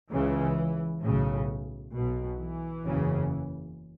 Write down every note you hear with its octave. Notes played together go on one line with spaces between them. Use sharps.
C#2 C#3 E3
B1 A2 C#3
B1 B2
E3
F#1 E2 C#3